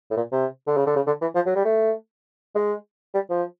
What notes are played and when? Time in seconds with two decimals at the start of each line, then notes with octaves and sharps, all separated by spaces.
0.11 A2
0.17 A#2
0.32 C3
0.67 D3
0.77 C#3
0.87 D3
0.96 C#3
1.07 D3
1.22 E3
1.35 F3
1.46 F#3
1.55 G3
1.65 A3
2.55 G#3
3.14 G3
3.30 F3